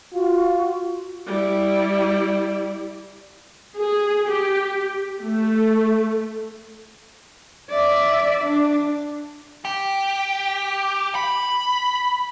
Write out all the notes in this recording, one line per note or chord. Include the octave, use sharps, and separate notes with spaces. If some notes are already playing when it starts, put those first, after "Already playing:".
F4 F#4
G3 E4
G#4
G4
A3
D5 E5
D4
G4
B5